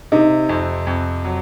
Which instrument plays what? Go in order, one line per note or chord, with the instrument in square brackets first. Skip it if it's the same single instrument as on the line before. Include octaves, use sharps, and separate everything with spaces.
[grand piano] C3 [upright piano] D#4
[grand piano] F2
F2
F#3